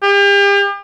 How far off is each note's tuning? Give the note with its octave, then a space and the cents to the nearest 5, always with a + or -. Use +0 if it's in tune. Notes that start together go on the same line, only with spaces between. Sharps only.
G4 +40